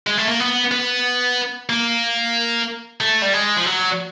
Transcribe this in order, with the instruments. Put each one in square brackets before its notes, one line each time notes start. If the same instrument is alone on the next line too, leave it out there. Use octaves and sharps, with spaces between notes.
[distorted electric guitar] G#3
A3
A#3
B3
B3
A#3
A3
G3
G#3
F3
F#3